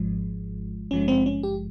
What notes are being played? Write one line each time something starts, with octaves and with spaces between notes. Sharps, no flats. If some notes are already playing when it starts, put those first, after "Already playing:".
Already playing: G#1 G#2 F3 G#3
G#1 G2 F3 G#3 C#4
C4
C#4
G4